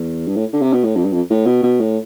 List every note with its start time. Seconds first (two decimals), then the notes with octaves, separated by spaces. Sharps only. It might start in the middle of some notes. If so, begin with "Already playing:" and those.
Already playing: E2
0.27 G2
0.36 A2
0.53 D3
0.62 C3
0.73 B2
0.84 A2
0.96 F2
1.04 G2
1.12 F2
1.30 A2
1.46 B2
1.63 B2
1.80 A2